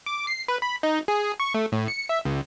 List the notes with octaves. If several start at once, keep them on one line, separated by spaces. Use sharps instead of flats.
D6
C7
B4
B5
D#4
G#4
C#6
A3
A2
C#7
E5
C#2